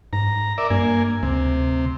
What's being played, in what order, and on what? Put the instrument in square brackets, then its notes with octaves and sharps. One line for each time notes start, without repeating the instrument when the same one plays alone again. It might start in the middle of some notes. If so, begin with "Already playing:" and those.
[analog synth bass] G#2 [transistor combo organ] A#5
[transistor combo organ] A#4 D5 E5
[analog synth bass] G2 [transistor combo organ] A#3 G#5
[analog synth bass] D2 [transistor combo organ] C3